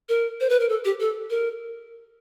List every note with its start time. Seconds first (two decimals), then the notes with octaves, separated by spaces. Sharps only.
0.09 A#4
0.40 C5
0.49 B4
0.60 A#4
0.69 A4
0.85 G4
1.00 A4
1.30 A#4